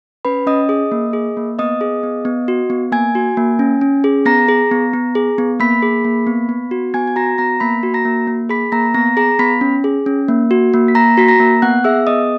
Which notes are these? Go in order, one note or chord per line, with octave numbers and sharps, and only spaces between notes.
C#4 B4 B5
C#4 D#5 D#6
G#4 D#5 D#6
A#3
G#4
A#3
B3 D#5 D#6
G#4
B3
B3
F#4
B3
A#3 G#5 G#6
F#4
A#3
C#4
C#4
G#4
B3 A#5 A#6
G#4
B3
B3
G#4
B3
A#3 B5 B6
G#4
A#3
B3
B3
F#4
B3 G#5 G#6
G#6
F#4 A#5 A#6
B3 A#5 A#6
A#3 B5 B6
F#4
A#5 A#6
A#3
A#3
G#4 B5 B6
A#3 A#5 A#6
B3 A#5 A#6
G#4 A#5 A#6
B3 B5 B6
C#4
G#4
C#4
A#3
F#4
A#3
B6
A#3 A#5 A#6
F#4 B6
A#5 A#6
A#3
B3 F#5 F#6
G#4 E5 E6
B3 D#5 D#6